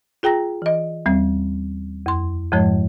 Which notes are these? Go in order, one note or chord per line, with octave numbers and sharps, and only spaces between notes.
F4 G#4 G5 A#5 A#6
E3 D#5
D#2 G3 C4
F2 C6
F2 G#2 F3 G#3 C#5